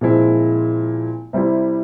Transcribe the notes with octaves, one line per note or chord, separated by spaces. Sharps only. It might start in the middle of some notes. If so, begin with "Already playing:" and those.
A#2 F3 G#3 C4 E4
C3 G3 C4 E4